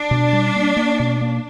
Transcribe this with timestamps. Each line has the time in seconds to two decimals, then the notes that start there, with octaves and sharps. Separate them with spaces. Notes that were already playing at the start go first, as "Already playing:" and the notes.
Already playing: D4
0.11 B2
0.33 G3
0.56 A#3
0.77 A#3
1.00 B2
1.21 A#3